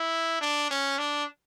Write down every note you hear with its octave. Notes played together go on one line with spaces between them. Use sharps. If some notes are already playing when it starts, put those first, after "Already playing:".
Already playing: E4
D4
C#4
D4